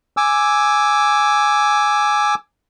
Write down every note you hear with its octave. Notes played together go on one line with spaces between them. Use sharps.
G#5 D6 E6